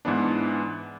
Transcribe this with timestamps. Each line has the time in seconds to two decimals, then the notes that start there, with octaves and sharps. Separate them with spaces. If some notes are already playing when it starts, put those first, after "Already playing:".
0.05 G#2 E3 B3 D4